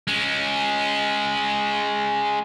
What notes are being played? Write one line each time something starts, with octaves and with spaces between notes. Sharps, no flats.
G#3 C#4